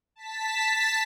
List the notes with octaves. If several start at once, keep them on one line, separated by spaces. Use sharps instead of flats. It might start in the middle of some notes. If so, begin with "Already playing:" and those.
A5 B6